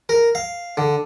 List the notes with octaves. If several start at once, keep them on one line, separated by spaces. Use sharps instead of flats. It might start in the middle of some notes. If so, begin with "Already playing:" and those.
A#4
F5
D3